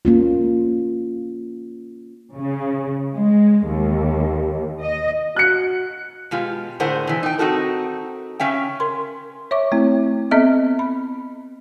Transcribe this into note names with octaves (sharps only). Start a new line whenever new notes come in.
A#3 C#4 F4
C#3
G#3
D#2
D#5
F#4 F#6 C#7
B2 G#3 F4 G4
A2 D3 G#4 A#4 C5 F#5
B2 E3
D#4 G5
C4 D#4 F#4 A4 A#4
C#3 C#4 E5 G5
A#4 C6
C#5 E5 C#6 D6
A3 C4 E4
B3 C4 A4 D#5 E5 F6
B5